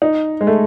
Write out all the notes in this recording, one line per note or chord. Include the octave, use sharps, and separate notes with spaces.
D#4
G#3
A3